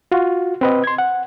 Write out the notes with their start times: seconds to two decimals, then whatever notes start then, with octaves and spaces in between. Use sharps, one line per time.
0.12 F4 F#4
0.61 C4 B4 D#5
0.84 C6 G#6
0.98 F#5